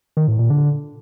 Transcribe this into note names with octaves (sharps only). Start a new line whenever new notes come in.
D#3
A2
A#2
D3